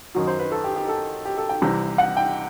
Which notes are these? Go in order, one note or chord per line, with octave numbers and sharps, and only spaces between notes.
F#2 D#3 F#3
C5
B4
A4
G4
G4
A4
G4
A4
G5
C2 C3 E3
F#5
G5